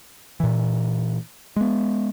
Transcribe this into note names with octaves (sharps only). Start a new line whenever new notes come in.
A#2 E3
G#3 B3